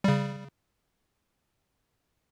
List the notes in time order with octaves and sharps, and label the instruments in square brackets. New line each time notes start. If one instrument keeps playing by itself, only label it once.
[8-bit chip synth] C#3 G3